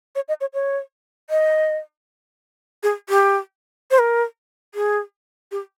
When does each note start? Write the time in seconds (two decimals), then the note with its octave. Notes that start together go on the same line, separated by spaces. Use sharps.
0.15 C#5
0.28 D#5
0.41 C#5
0.54 C#5
1.30 D#5
2.83 G#4
3.09 G4
3.91 C5
3.99 A#4
4.75 G#4
5.51 G4